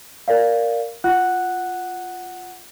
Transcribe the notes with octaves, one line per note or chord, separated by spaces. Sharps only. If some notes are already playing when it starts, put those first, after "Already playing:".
A#4 D5 F5
F4 F#5 F#6